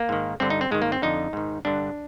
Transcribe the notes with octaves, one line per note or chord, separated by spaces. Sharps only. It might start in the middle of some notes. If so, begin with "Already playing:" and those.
Already playing: A#3
G#2 D#3
G2 D3 C4
D#4
C4
G#2 D#3 G#3
A#3
C4
F2 D3 D#4
G#2 D#3
G2 D3 D4